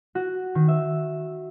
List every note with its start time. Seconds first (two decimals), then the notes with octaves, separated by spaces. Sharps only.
0.15 F#4
0.55 D#3
0.68 E5